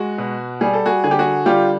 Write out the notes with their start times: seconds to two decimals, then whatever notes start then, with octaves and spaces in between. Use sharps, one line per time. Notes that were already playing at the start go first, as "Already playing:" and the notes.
Already playing: G#3 F#4
0.18 B2
0.61 G3 G#4
0.73 A4
0.86 F#4 G#4
1.04 D3 G#4
1.11 G4
1.19 F#4 G#4
1.46 G3 F4 G4